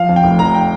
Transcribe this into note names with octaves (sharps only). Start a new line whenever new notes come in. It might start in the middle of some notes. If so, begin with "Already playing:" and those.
Already playing: F3 F5
F2
G5
F1
F1 A#5
G5